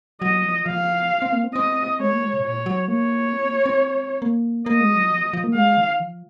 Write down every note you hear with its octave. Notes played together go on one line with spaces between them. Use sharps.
F#3 D#5
F3
F3 F5
C4
A#3
C4
C4 D#5
G#3 C#5
A#3
G#3
C3
G#2
A#2 C#5
F#3
A#3 C#5
C4
A#3
C4
A#3
A#3 D#5
G#3
F#3
F3
F3
A#3
G#3 F5
D#3
F3